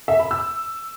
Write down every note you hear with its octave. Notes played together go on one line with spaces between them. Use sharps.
E5
B5
E6